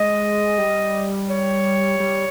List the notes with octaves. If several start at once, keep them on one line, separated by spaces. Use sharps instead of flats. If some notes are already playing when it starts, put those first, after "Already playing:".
Already playing: G#3 D#5
G3
C#5
G3